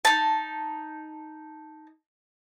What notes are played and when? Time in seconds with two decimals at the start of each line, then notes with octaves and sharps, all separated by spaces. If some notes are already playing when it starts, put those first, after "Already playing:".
0.05 D#4 A5